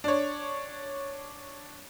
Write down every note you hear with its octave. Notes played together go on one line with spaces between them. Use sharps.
D4 C#5